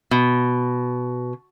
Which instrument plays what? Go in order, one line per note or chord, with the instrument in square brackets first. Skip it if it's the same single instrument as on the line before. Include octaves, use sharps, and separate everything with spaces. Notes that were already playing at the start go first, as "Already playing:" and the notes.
[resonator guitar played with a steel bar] B2